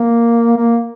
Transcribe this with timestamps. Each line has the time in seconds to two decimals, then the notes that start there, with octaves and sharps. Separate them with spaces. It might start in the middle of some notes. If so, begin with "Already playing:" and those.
Already playing: A#3
0.57 A#3